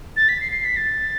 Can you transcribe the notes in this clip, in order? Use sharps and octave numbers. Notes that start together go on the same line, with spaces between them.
A6
B6
C7
C7
B6
A6